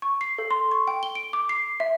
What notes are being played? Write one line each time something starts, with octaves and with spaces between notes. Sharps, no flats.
C#6
C7
A4
C6
C#6
G5
G7
D7
D6
C7
E5